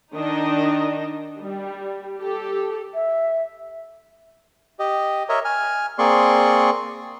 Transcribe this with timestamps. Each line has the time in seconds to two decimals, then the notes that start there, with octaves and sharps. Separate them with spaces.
0.15 D#3 D4 D#4 D#5
1.41 G3
2.22 G4 A4
2.94 E5
4.79 G4 D#5
5.29 A#4 C#5 D#5 E5
5.45 G#5 F6
5.98 A#3 C4 G#4 D5 C6 C#6